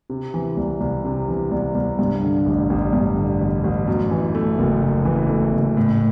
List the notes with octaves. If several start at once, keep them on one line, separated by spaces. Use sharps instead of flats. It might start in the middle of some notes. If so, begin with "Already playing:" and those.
C3
E3
C2
C2
C3
E3
C2
C2
G2
D3
A1
A1
G2
D3
A1
A1
F#2
E3
A3
F#1
F#2
E3
A3
F#1
A2